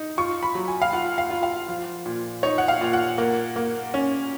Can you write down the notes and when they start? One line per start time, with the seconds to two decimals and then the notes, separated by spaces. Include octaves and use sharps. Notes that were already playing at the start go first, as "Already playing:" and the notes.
Already playing: D#4
0.18 F4 C#6
0.43 B5
0.55 F#3
0.68 G#5
0.82 F5
0.93 F4 F#5
1.18 F5
1.30 F4
1.43 F5
1.68 F3
2.06 A#2
2.43 D#4 C#5
2.58 F#5
2.68 F5
2.81 A#2
2.93 F#5
3.18 A#3
3.56 A#3
3.94 C#4